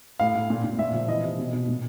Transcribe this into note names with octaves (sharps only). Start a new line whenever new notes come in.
A2 F5
A2
A#2
A#2
A#2 E5
F3
E3 D#5
C3
B2
B2
A#2